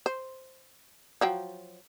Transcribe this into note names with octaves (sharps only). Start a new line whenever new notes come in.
C5
F3 F#3 G5